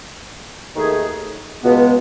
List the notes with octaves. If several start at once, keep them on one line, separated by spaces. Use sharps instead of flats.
D#2 D#3 A3 D#4 G#4
C#2 B2 G#3 B3